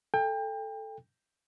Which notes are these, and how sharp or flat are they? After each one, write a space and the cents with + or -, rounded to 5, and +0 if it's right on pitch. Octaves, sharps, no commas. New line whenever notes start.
A4 +0 G5 +30